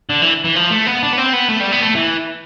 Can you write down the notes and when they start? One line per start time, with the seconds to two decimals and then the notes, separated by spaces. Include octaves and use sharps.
0.10 D3
0.22 E3
0.45 E3
0.56 F3
0.71 A3
0.87 B3
1.03 D4
1.13 B3
1.17 C4
1.33 B3
1.49 A3
1.60 G3
1.72 B3
1.82 A3
1.95 E3